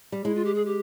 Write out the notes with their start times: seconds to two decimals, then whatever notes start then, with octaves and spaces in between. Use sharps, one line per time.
0.12 G3
0.24 G#3 E4
0.35 F4
0.45 G4
0.55 G#4
0.65 G4